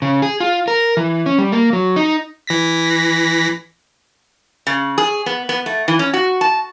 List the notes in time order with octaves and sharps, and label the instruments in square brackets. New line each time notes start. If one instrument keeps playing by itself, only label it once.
[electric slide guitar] C#3
G#4
F4
A#4
E3
C#4
G3
A#3
F#3
D#4
[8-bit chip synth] E3 A#6 B6
[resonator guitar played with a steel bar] C#3
G#4
B3
B3
A3
E3
C#4
F#4
A5